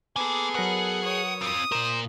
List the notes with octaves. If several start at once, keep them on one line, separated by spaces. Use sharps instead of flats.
A#3 B3 G#4 A4 G#5
F#3 A#4 B4 F#5
C#5 D#6
C4 F4 D#6
A#2 A#4 C5 A#5